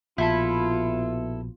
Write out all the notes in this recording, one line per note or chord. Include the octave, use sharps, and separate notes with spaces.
A#1 B2 E4 F4 A4 B5